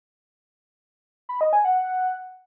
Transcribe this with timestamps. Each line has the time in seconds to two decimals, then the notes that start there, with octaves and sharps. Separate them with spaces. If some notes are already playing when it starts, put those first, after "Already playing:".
1.29 B5
1.41 D#5
1.53 G#5
1.65 F#5